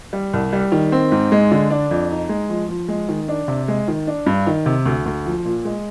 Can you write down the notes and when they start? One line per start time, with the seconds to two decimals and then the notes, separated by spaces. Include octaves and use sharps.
0.13 G3
0.33 C2
0.53 G3
0.72 D#3
0.92 C4
1.12 G#2
1.32 G#3
1.51 D3
1.70 D4
1.91 F2
2.11 D#4
2.29 G#3
2.50 F3
2.69 F3
2.88 G#3
3.09 D#3
3.28 D4
3.48 C3
3.68 G#3
3.88 D#3
4.07 D4
4.26 G2
4.47 D#3
4.66 C3
4.86 D2
5.06 D2
5.26 F3
5.45 A#2
5.65 G#3